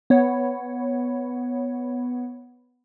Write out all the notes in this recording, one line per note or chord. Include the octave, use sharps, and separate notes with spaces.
B3 C#5